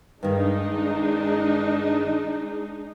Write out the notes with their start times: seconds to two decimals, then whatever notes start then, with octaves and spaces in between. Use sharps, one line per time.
0.23 G2 D#3 G#3 D4 D#4